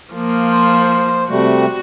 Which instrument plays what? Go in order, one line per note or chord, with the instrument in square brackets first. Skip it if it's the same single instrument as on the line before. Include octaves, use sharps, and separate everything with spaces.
[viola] F3 A#3
[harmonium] C5
[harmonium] C3 G3 A3 [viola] F#4